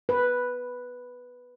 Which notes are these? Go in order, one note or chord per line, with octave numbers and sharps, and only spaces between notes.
B4